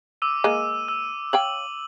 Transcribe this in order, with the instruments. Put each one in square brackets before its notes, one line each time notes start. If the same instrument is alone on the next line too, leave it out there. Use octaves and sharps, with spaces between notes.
[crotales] D6 E6 D#7
[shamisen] G#3 A#3 [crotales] D#7
[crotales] E6
[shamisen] C#5 F5 G5 [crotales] F#7